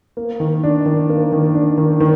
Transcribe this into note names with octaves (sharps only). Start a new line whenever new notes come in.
A#3
D#3
D4
D#3
A#3
D#3
D4
D#3
D#3